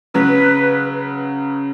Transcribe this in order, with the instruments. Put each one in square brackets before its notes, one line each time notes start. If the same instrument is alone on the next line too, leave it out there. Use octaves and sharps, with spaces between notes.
[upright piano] C#3 F#3 [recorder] B4